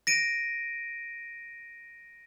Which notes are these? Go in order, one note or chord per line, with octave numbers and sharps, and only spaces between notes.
A#6 D7 D#7